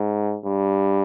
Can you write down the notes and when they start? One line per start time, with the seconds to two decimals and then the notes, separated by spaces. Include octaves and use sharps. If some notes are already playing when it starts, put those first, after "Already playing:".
Already playing: G#2
0.45 G2